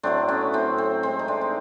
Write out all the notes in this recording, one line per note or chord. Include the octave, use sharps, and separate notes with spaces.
A2 F#3 A3 C4 D4
B3 C#4
A2 F#3 A3 C4
C4
A2 E3 G#3 C4
D#4
C4 D4
D#4